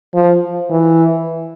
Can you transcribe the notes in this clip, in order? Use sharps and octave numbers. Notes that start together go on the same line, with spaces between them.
F3
E3